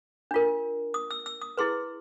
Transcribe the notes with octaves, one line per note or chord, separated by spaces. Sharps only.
D4 F4 A#4
D#6
E6
E6
D#6
E4 G#4 B4 C6